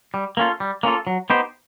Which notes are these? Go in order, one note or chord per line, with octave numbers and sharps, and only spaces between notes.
G3
A#3 C#4 F4 A4
G3
A#3 C#4 F4 A4
F#3
B3 D#4 G4 C5